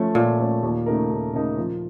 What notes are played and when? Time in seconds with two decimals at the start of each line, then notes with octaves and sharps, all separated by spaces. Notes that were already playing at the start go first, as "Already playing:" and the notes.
Already playing: F3 A3 C#4
0.15 A#2 F3
0.39 A3 C#4
0.63 D#2
0.86 C#3 A3 D#4 A#4
1.11 D#2
1.34 C#3 A3 D#4 A#4
1.58 F3